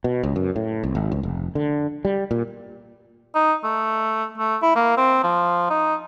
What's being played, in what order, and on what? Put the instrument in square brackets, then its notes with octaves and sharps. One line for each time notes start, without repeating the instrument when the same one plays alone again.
[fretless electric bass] B2
C#2
F#2
A2
C2
G#1
C#2
F1
D3
G3
A#2
[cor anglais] D#4
A3
A3
E4
A#3
C4
F3
D#4